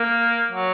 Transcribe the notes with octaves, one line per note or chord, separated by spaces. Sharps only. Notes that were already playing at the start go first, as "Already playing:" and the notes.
Already playing: A#3
F#3